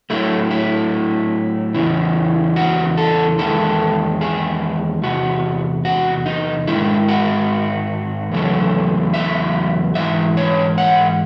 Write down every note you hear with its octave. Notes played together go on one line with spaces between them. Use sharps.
A2 F#3 A3 E4
E4
E2 C#3 E3
F#4
A4
E2 D#3 G#3 A4
G#4
E2 C3 F#4
F#4
D#4
G#2 D#3 G#3 E4
F#4
E2 C#3 F#3 A3
E5
G#2 E3 E5
C#5
F#5